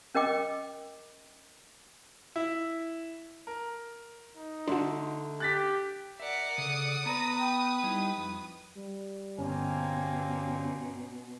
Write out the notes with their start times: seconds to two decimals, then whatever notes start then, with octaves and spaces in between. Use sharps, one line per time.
0.15 C#4 A#4 D#5 G5 D6
2.36 E4
3.47 A#4
4.37 D#4
4.67 D3 A3 D4 F#4 C6
5.40 G4 F#6 A6 B6
6.20 A#4 D5 E5 F#5
6.58 C#3 A4 D#6
7.06 B3 B4 A5 A#5
7.39 G5
7.83 G3 D#4 E4
8.17 F2
8.75 G3
9.38 G1 B2 A#3 C4 C#4 G#5